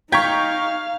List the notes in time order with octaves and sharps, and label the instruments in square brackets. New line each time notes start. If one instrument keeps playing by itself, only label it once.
[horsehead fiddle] D#4 [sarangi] F5 [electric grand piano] G5 A#5 C#6 [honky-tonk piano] G6 G#6 B6